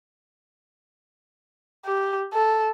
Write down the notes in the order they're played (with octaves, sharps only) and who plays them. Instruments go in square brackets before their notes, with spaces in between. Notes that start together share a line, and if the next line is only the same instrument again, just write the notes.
[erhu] G4
A4